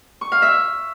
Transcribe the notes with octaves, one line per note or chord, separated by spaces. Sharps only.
C#6
F5
E5